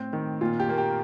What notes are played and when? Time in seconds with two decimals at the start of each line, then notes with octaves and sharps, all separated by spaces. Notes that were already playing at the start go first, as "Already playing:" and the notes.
Already playing: A2 C4
0.13 D#3
0.41 A#2 F4
0.60 G4
0.69 A#3
0.78 G4